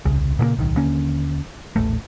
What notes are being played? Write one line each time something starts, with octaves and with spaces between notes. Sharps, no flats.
D#1 C2 C#3
A#2 C#3 F3 A#3
D1 B1 D#3
D#2 D3 A#3 C#4
D#1 A1 A3